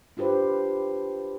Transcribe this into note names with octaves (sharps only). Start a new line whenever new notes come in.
D4 F4 G4 B4 C5